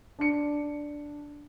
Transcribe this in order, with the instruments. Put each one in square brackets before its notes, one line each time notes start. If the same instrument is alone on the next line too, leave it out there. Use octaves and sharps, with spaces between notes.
[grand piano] D4 C#7